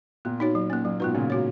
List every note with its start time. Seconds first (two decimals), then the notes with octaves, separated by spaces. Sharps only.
0.25 A#2 B3
0.40 D#4 F#4 C#5
0.55 F#3
0.70 A#3 C#4
0.85 A#2 F#3
1.00 G#2 B2 B3 F4 B4
1.14 A#2 C#3 C#4
1.30 F#4 C#5